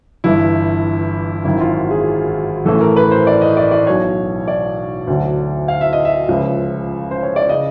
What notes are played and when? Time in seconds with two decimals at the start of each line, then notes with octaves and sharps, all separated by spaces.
0.24 G1 G2 E3 E4
1.45 G#1 F#2 D#3 F#3 E4
1.60 F4
1.76 F#4
1.90 G#4
2.66 A1 A2 E3 A4
2.81 A#4
2.96 B4
3.11 C5
3.27 D5
3.42 D#5
3.57 D5
3.71 D5
3.87 B1 B2 F#3 C#5
4.48 D5
5.07 D2 D3 F#3
5.68 F5
5.81 E5
5.93 D#5
6.05 E5
6.28 C#2 C#3 F3
7.11 C5
7.23 C#5
7.36 D5
7.49 C#3 D#5